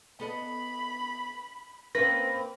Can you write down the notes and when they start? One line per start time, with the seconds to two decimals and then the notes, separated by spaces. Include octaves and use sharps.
0.20 B3 A4 D#5 B5
1.95 A#3 C4 C#4 B4 C5 A#6